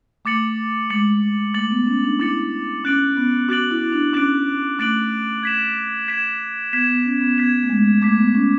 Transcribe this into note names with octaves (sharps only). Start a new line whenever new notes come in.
A3 D6 A6 C#7 F#7
G#3 D6 A6 C#7 F#7
A3 D6 A6 C#7 F#7
B3
C#4
D4
E4 D6 A6 C#7 F#7
C#4 D6 F#6 A6 D7 F#7
B3
F#4 D6 F#6 A6 D7 F#7
E4
D4
C#4 D6 F#6 A6 D7 F#7
A3 D6 F#6 A6 D7 F#7
G#6 B6 E7
G#6 B6 E7
B3 G#6 B6 E7
B3
C#4
B3
B3 G#6 B6 E7
A3
G#3
A3 D6 G#6 B6
B3
C#4